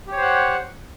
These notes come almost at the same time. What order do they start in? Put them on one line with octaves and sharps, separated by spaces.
G4 C#5 C5 F#5